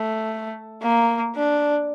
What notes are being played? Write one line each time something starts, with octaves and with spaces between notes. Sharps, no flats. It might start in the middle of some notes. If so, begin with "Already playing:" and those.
Already playing: A3
A#3
D4